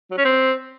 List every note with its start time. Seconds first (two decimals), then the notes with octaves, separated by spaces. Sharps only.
0.11 F#3
0.18 C#4
0.25 C4